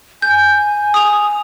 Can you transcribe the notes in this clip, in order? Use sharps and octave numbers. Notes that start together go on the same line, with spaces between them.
G#5 G6
D#6 F7